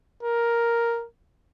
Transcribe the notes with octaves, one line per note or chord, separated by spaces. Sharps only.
A#4